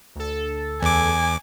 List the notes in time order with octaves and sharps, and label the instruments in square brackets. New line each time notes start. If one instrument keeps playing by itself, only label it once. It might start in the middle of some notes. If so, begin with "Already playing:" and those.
[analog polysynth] D2 A4
[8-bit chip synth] E2 D6 [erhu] G#5